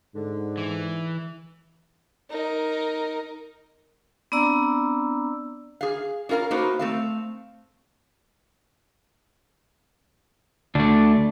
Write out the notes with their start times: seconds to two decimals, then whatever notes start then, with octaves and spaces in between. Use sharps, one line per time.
0.15 G#2 D3
0.57 E3
2.31 D#4 A#4
4.32 B3 C4 D4 D5 A#5 E6
5.81 G#4 F5
6.29 C#4 F4 A#4 F5 A#5
6.51 A#3 B3 D#4 F#4 C5
6.79 A3 C4 F5
10.75 D2 A3 D4